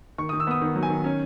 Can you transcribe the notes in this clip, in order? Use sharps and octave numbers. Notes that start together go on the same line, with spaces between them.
D#3 C#6
D#6
D#3
E6
B3 D#6
D#3
F#3
G#5
D#3
C#4